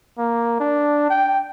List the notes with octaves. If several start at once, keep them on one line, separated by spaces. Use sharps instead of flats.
A#3
D4
G5